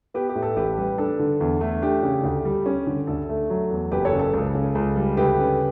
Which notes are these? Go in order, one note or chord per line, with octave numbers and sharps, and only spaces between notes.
B3 G4 B4
G4
A2
A4
A1 G4 B4
G3
D4 A4
D3
E2
A3
D4 G4
C#3
D2
G3
C#4
D3
D2 A4
A3
F#3
E2
F#1 G4 B4
A4 C#5
C#3
A4
C#2 A4
C#3
C#2
G3
D2 G4 B4
C#3